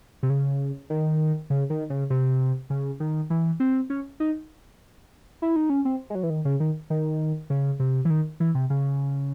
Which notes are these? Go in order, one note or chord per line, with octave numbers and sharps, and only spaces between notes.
C3
C#3
D#3
C#3
D#3
C#3
C3
C#3
D#3
E3
C4
C#4
D#4
E4
D#4
C#4
C4
G#3
F#3
E3
D#3
C#3
D#3
D#3
C#3
C3
E3
D#3
E3
C3
C#3